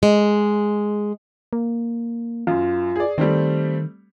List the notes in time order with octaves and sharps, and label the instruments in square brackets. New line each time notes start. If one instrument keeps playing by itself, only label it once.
[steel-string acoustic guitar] G#3
[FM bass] A#3
[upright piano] F#2 [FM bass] F4
[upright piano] G#4 D5
[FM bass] D#3 [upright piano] G3 A3 C4